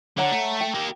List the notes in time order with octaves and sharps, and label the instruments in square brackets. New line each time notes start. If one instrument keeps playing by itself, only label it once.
[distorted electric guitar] D3 [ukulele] C#5 F#5 A#5
[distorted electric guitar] A3
[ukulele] G5
[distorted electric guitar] A#3 G4